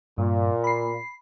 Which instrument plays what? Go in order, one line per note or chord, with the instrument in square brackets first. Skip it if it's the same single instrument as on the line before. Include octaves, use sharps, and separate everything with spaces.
[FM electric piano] G2 [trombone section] A#2
[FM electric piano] B5 C7